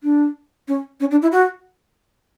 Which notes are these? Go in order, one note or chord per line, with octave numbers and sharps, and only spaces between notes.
D4
C#4
C#4
D4
E4
F#4